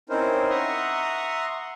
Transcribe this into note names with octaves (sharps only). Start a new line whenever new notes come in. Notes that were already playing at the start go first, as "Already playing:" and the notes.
C4 C#4 D#4 E4 A#4 C5
E5 F#5 A#5 C6 C#6 D#6